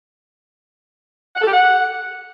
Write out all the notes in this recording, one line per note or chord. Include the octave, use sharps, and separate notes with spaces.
F#5
A4
G4
F#5